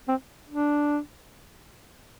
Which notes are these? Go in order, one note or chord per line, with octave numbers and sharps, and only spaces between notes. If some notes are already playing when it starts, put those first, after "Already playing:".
C4
D4